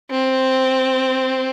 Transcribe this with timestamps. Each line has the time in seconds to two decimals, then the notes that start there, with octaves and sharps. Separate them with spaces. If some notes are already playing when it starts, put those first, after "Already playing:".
0.11 C4